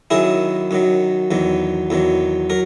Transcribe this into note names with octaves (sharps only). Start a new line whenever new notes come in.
F#2 D#3 F#3 E4 G#4
F#2 D#3 F#3
E2 D#3 F#3
E2 D#3 F#3
F#3 A#4